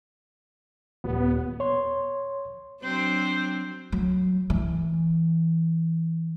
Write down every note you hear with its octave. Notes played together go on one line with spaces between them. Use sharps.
D#1 B3
C#5 C6
F#3 C4 D4 C5
F#3
E3